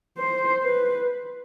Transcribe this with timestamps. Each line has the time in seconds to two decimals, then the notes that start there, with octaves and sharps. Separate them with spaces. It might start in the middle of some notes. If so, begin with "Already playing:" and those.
0.18 C5
0.63 B4